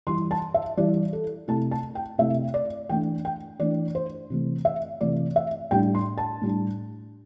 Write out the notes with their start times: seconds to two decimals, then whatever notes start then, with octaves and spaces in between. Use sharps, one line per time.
0.07 E3 G3 E4 C6
0.31 A5
0.54 E5
0.77 E3 G3 E4 D5
1.13 A4
1.48 C3 A3 E4 A5
1.71 A5
1.95 G5
2.18 C3 A3 E4 E5
2.54 D5
2.89 E3 A3 D4 G5
3.25 G5
3.60 E3 A3 D4 D5
3.95 C5
4.30 C3 E3 A3
4.65 E5
5.01 C3 E3 A3 D5
5.36 E5
5.71 A2 G3 D4 G5
5.95 C6
6.18 A5
6.42 A2 G3 D4